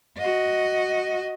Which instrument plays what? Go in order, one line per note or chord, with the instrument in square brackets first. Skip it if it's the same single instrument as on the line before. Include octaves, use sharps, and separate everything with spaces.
[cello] F#4 D#5